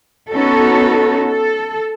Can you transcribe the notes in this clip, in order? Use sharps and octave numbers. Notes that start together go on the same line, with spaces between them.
B3 C#4 D#4 F#4 A4
A4